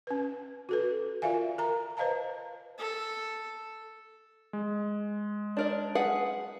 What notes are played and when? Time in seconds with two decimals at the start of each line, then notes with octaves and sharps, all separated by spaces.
0.07 C#4 B4
0.69 F#4 A4 B4
1.22 F4 A#4 D5 E5 F5 G#5
1.58 A#4 A#5
1.97 B4 C5 D#5 F5 A5 A#5
2.78 A4
4.53 G#3
5.57 D4 A#4 D5
5.95 G#4 B4 F#5